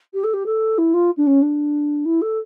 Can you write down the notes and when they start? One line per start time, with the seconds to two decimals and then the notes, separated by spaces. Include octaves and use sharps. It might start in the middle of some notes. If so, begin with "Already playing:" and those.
0.14 G4
0.24 A4
0.33 G4
0.46 A4
0.78 E4
0.93 F4
1.17 D4
1.26 C#4
1.42 D4
2.05 E4
2.21 A4